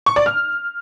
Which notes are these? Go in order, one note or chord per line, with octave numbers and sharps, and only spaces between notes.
C#6
D5
F6